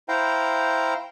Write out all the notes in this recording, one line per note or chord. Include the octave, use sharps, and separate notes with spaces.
E4 C5 F5 G5 A#5